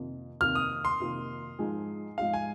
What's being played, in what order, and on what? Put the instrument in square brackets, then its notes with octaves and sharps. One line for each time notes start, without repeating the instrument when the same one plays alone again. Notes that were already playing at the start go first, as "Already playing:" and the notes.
Already playing: [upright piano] F2 C3 D#3 A#3 F4
[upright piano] F2 C3 D#3 A#3 F4 [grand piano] F6
[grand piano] D#6
C6
[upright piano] F2 C3 D#3 A#3 F4
G#2 F3 G#3 D#4 G#4
[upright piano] G#2 F3 G#3 D#4 G#4 [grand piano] F5
[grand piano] G#5